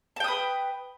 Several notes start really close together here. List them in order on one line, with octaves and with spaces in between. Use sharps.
A5 G5 D#6 B4